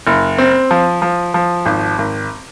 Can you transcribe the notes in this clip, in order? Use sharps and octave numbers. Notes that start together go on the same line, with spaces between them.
F#1
C4
F3
F3
F3
G#1
G#1